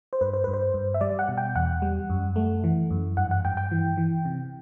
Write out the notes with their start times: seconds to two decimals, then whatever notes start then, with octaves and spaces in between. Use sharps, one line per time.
0.13 C5
0.21 G2 B4
0.33 C5
0.44 G2 B4
0.54 C5
0.74 G2
0.94 E5
1.01 G3 D5
1.19 F#5
1.29 B2
1.38 G5
1.56 E2 F#5
1.82 G3
2.10 F#2
2.36 A3
2.64 E3
2.90 F#2
3.17 G2 F#5
3.31 F#5
3.45 G2 G5
3.57 G5
3.72 E3
3.97 E3
4.25 C3